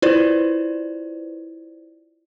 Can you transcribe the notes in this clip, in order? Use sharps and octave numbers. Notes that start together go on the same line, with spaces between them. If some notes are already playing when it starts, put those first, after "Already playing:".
E4 F4 B4 C5 D5